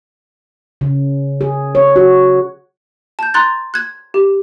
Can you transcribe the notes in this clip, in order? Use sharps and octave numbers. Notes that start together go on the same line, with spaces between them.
C#3
G#4
C#5
F#4
A5 G6
A#5 C6 F#6 A6
F#6 G#6
G4